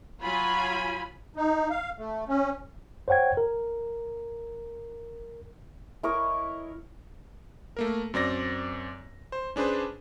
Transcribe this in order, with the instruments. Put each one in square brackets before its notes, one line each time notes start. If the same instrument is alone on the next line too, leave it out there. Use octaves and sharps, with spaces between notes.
[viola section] F#3 F4 G#5 B5
[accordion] D#4
F5
A3
C#4
[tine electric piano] C5 C#5 F#5 G5 G#6
A#4
[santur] E4 A#4 C#5 D#5
[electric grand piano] A3 A#3 A#4
F#2 C4 D5 A#6
C5
C#4 D4 G#4 B4 C5